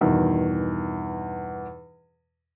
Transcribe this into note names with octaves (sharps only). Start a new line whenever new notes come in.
E2 G2 B2 D#3